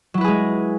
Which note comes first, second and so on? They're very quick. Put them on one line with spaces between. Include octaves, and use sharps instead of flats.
F#3 E4 B4 G#4 G#3